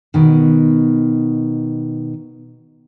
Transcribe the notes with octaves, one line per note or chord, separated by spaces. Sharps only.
B2 D#3